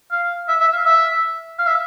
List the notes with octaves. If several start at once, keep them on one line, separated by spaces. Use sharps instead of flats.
F5
E5
E5
F5
E5
F5
E5